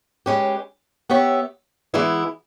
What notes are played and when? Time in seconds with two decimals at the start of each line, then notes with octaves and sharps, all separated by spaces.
0.26 G#3 C#4 G4 B4
1.09 B3 G4 C#5 E5
1.94 E3 G#3 B3 E4